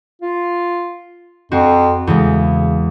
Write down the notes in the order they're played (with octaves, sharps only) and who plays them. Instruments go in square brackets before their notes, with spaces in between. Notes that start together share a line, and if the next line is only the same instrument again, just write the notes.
[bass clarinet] F4
[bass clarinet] F2 [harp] C4 F#4
[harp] E2 G#3 [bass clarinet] C#3